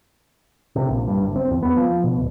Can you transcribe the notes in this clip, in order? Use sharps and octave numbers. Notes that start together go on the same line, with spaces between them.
C3
A#1
G2
F#1
C4
E2
B3
F3
B2
D1